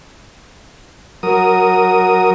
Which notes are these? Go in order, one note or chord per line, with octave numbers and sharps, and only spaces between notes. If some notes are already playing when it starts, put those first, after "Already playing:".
F#3 A#4 D#6